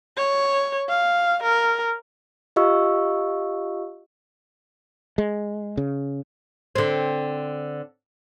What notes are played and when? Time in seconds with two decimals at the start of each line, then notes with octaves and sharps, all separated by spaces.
0.17 C#5
0.89 F5
1.43 A#4
2.56 F4 G4 D#5 F5 C#6 E6
5.18 G#3
5.77 C#3
6.75 D3 C4